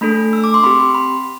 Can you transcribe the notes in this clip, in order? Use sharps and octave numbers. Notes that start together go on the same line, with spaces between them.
A3 D4 A4 B5
E6
D6
C6
C4 G4 B5
C6
B5